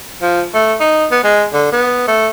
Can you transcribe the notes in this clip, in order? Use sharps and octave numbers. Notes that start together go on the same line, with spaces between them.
F3
A3
D#4
B3
G#3
D3
B3
A3